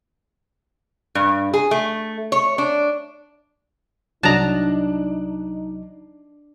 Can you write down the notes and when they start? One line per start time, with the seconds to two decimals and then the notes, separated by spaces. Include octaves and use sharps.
1.15 G2
1.54 G#4
1.71 A3
2.32 C#5
2.58 D4
4.23 C2 F#3 D4 D#4 D#5 A5 A#5